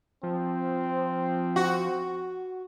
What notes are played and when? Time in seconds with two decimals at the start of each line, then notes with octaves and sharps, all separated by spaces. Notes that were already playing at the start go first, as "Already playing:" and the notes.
0.23 F3 C4
1.56 F#4